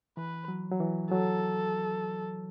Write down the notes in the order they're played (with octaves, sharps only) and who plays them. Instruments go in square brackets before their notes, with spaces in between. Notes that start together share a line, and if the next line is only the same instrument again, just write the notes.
[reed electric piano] E3 [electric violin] B4
[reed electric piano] F#3
F#3
E3
[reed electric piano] F#3 [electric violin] A4